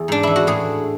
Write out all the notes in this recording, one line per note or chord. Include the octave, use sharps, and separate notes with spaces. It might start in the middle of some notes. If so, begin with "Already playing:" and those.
Already playing: E2 G#4
G#2 D4
E3 E4
F#4
A2 G#4